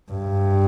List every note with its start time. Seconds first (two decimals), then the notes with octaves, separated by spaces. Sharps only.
0.12 G2